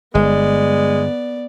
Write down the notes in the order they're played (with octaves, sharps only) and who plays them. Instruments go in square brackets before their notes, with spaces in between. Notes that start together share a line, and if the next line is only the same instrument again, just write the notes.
[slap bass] G1 [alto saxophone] G#3 [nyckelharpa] B3 D5